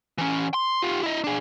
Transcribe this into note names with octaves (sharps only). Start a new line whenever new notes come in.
E3 C#4
C6
F4 G4
E4 D#5
D4 G#4